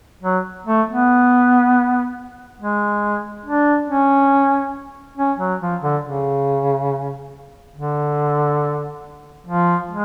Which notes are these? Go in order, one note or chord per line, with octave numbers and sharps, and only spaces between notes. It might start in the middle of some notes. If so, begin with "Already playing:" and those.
F#3
A3
B3
G#3
D4
C#4
C#4
F#3
F3
D3
C#3
D3
F3
G#3